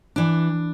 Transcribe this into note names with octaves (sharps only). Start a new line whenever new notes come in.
E3 D4